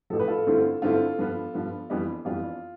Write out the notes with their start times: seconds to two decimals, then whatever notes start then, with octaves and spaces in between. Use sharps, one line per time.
0.10 A1 A2 F3 A4
0.19 B4
0.28 F4 A4
0.47 G2 D3 A3 C4 E4
0.82 G2 D3 A3 C4 E4 F4 A4
1.18 G2 F3 B3
1.54 G2 F3 B3
1.90 F2 E3 G3 B3 D4
2.25 F2 E3 G3 B3 D4 F4